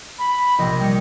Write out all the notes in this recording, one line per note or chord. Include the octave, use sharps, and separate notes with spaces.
B5
A#1 C3 D#5
G3 C#7